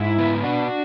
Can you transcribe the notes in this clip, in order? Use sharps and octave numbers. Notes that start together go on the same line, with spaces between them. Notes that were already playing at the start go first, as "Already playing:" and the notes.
Already playing: G#2 E4
B3
D4 F#4